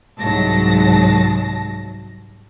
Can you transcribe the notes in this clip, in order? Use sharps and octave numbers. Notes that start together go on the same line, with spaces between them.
C2 G#2 F#3 A5 A#6